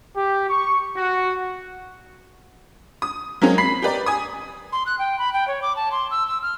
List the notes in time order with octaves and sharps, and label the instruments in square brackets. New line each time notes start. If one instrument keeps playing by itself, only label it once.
[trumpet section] G4
C#6
F#4
[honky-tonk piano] D#6
F#3 G#3 A#3 C4 C#4
B5 B6 C7
G4 A#4 B4 D5
G#5 D#6
[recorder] C6
F#6
G5
B5
G5
C#5
D6
A5
C6
E6
E6
F6